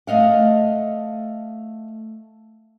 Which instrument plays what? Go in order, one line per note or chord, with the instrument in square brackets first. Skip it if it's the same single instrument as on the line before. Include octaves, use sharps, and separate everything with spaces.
[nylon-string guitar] A3 D#5 F5 F#5